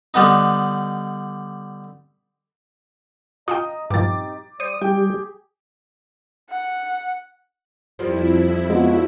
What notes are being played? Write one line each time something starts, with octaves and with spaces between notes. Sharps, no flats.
D3 G3 B3 D#4
F4 D#5 F5 G5 A#5 D#6
G2 A#2 F3 C4 D#4 G4 D6 A6
G3 C5 D5 D#6 C#7
G3 G4 G#4 G5
F#5
F2 F3 G3 A#3 E4
G#3 B3 D4 F4 F#4